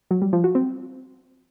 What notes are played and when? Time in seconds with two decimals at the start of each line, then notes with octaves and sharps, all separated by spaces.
0.11 F#3
0.22 G3
0.33 F3
0.44 F#4
0.55 C4